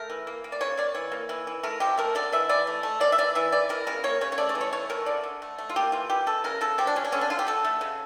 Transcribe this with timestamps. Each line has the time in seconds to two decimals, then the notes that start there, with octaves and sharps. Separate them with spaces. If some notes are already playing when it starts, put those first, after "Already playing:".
Already playing: A3 A#4
0.10 E3
0.27 A#3
0.44 A#3
0.52 D5
0.61 C#3 C#5
0.77 A#3 D5
0.94 E3 C#5
1.12 A#3
1.29 E3
1.47 E3
1.63 A3 A#4
1.80 F3 G4
1.97 A3 A#4
2.15 D3 D5
2.32 E3 E5
2.49 E3 D5
2.67 A3
2.83 A3
3.00 A#3 D5
3.12 E5
3.18 E3 D5
3.35 E3 E5
3.52 E3 D5
3.69 E3 A#4
3.87 C#3 A#4
4.04 A#3 C#5
4.21 C#3 C#5
4.32 C#5
4.38 A3 D5
4.49 D5
4.55 E3
4.61 C#5
4.73 A3 C#5
4.90 E3 A#4
5.06 D3 D5
5.23 D3
5.42 A3
5.58 A3
5.69 F4
5.76 A#3 G4
5.92 E3 F4
6.10 E3 G4
6.26 E3 A4
6.44 C#3 A#4
6.61 C#3 A4
6.78 F3 G4
6.87 D4
6.96 C#3 C#4
7.04 D4
7.12 D3 C#4
7.21 D4
7.30 D3 F4
7.39 G4
7.47 D3 A4
7.65 A3
7.81 C#3